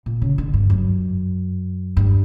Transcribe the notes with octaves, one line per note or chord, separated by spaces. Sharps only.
A#2
C#3
D3
G2
F#2
G2